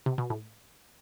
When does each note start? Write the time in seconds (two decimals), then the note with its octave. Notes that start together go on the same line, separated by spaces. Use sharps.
0.06 C3
0.18 B2
0.30 A2